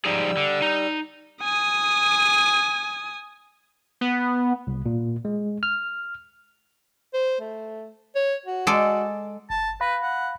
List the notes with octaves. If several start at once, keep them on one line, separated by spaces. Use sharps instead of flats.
F3 G3 D#4 G#4 E6
D3
D#4
G#5 D#6
B3
C2
A#2
G#3
F6
C5
A3
C#5
F#4
G#3 A4 D5
G1 A5
B4 F5 B5 A#6
F#5